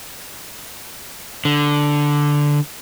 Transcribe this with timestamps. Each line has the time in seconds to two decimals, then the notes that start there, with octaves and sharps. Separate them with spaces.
1.45 D3